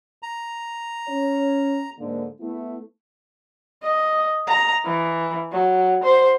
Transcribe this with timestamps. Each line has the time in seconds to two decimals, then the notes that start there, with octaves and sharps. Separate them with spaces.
0.23 A#5
1.08 C#4 C#5
1.98 G#2 D3 A#3
2.41 A3 B3 E4
3.83 D#5
4.47 A#5
4.85 E3
5.52 F#3
6.03 C5